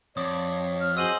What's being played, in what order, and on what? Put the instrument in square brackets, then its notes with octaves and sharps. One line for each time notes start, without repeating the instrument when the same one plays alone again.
[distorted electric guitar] F2 [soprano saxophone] C#5 [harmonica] D5 [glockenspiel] D#6
[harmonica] F6
[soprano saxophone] F#4 [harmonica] G#4 C5 D#5 [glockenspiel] E6 D#7 F#7